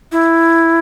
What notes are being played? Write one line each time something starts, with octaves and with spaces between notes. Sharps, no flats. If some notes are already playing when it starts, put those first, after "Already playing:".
E4